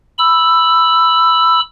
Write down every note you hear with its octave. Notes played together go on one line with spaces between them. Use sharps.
B5 E6